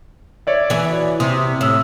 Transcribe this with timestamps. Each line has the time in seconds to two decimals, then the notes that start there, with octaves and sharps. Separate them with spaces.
0.47 C#5 D5 E5
0.70 E3 G#4
0.90 F#4 D5
1.20 C3 D#6
1.61 A2 E6 E7